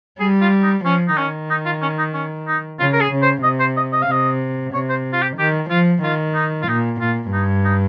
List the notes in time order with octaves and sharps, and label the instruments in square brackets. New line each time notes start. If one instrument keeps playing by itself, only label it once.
[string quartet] G3 [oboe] G#4
[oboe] F4
D#4
[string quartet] F3 [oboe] C#4
[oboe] D#4
[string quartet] D#3 [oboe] C#4
[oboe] D#4
F4
C#4
D#4
C#4
D#4
[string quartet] C#3 [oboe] F4
[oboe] A#4
G#4
[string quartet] C#3
[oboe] C5
[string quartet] C3 [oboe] D#5
[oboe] C5
D#5
D#5
F5
[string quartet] C3 [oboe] D#5
[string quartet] C3 [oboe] C#5
[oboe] C5
F4
G4
[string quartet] D#3 [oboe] G4
[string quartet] F3 [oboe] F4
[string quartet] D#3 [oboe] F4
[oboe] D#4
F4
[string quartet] A#2 [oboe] D#4
[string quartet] A#2 [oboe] F4
[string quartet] G2 [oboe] D#4
[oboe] D#4